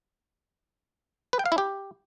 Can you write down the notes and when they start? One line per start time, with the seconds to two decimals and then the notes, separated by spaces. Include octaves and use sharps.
1.33 B4
1.39 G5
1.46 F5
1.52 E4
1.58 G4